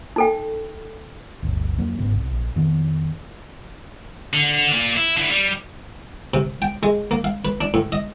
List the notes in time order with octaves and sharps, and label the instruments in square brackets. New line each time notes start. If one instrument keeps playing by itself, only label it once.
[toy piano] D#4 A4 G5
[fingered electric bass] G1 D2
F2 F#3 A#3
G1 G#2 C#3 B3
C2
A#1
F2 D#3 B3
[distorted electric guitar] D3
A#3 D5
E4
D3 E4
G3
[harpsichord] C3
G5
G#3
A#3
F5
B4
D4
A2
D#5